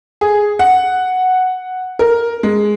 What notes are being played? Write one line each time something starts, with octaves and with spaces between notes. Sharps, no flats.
G#4
F#5
A#4
G#3